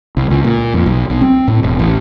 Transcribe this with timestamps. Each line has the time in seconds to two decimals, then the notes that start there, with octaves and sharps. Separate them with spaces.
0.17 C2
0.30 C#2
0.44 A#2
0.74 F2
0.86 B1
1.10 B1
1.21 C4
1.48 A2
1.63 E1
1.79 A1